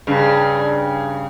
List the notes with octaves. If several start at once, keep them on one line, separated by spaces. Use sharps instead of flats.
G2 C#3